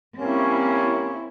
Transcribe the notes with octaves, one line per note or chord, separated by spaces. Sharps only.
G3 A#3 C4 C#4 E4